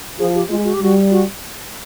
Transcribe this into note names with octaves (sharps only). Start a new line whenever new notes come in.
F3 G#4
G4
G#3 F4
F#4
G4
G3 F#4
F#4